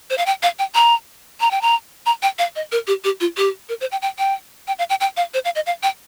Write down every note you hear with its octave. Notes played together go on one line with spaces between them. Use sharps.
C5
F5
G5
F5
G5
A#5
A#5
G5
A#5
A#5
G5
F5
D#5
A#4
G4
G4
F4
G4
A#4
C5
G5
G5
G5
G5
F5
G5
G5
F5
C5
F5
D#5
F5
G5